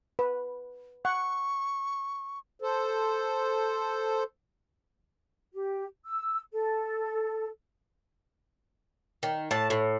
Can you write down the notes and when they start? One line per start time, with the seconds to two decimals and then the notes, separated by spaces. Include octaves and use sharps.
0.19 B4
1.05 F#5 C#6
2.62 A4 C5
5.53 G4
6.05 E6
6.52 A4
9.23 D#3
9.51 A2 A5
9.70 A2